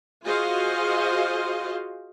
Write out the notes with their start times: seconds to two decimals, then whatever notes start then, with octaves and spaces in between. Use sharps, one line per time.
0.24 F4 F#4 G#4 C5 D#5 F5